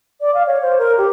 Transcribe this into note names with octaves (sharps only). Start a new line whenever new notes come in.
D5
F5
C#5
C5
A#4
G4